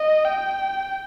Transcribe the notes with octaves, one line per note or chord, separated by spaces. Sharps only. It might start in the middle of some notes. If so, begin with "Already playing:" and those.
Already playing: D#5
G5